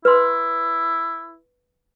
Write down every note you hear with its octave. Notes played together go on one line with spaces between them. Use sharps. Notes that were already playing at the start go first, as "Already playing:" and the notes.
E4 B4 C6